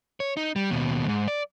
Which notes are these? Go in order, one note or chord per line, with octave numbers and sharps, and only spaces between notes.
C#5
D#4
G3
D#2 B2
D2 G#2
D5